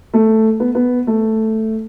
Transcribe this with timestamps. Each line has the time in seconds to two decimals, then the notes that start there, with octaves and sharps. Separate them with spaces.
0.14 A3
0.60 B3
0.75 B3
1.07 A3